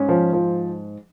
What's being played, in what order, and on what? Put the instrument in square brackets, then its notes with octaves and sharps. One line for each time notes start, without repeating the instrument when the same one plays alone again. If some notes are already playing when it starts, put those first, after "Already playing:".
Already playing: [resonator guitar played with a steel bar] G#2 [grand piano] C#4
[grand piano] F3
F3